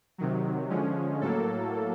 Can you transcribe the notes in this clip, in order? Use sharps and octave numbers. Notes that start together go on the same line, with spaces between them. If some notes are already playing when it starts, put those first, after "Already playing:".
C3 D#3 F#3
D3 F3 G#3 C#4
A2 F#3 A#3 A4